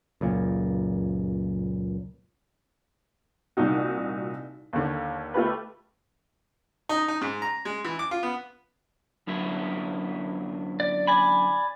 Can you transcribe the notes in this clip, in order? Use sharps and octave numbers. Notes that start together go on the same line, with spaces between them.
C#2 F#2 A#2
C2 A#2 D#4 F#4
D#2 D3
A3 F4 G4 B4
D#4
D#4
G#2
A#5
G#3
E3
D6
F4
B3
F#2 D3 E4
D5
D5 G#5 B5